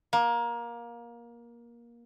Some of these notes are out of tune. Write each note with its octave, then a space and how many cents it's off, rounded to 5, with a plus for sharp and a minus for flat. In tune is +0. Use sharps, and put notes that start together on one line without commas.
A#3 +20